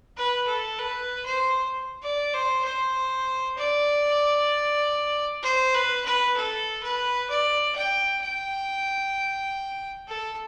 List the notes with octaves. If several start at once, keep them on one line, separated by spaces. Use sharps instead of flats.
B4
A4
B4
C5
D5
C5
C5
D5
C5
B4
B4
A4
B4
D5
G5
G5
A4